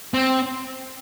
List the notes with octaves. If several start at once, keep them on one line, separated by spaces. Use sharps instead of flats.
C4